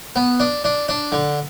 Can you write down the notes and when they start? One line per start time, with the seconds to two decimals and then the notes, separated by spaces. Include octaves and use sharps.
0.16 B3
0.40 D4
0.64 D4
0.89 D4
1.12 D3